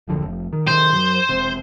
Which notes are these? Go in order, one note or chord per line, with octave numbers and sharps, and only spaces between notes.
D1 F2 D3
F1
D#3
C3 D#3 C5
F#2
E1 C3